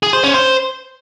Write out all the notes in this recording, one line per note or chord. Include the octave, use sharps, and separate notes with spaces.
G#4
C5
C#4
C5